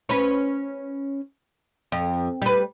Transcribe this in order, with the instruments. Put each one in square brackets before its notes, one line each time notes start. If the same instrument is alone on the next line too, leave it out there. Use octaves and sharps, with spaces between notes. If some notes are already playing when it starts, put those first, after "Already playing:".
[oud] C#4 B4
F2
G3 B4